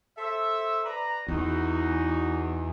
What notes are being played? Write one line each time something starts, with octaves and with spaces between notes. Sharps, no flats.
A4 C5 E5
B4 D5 A#5
E2 D#4 F#4